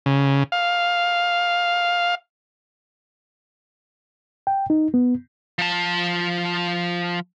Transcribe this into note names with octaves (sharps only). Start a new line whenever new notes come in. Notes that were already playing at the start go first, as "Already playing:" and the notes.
C#3
F5
G5
D#4
B3
F3 A5